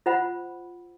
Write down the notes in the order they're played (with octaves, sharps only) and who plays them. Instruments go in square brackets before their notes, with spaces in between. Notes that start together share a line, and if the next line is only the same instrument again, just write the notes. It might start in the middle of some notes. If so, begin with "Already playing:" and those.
[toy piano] F4 C5 F#5 B5